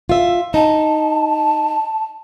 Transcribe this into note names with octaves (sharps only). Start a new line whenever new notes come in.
F4 E5
D#4 A5